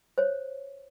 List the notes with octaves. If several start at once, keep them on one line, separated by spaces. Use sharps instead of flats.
C5 C#5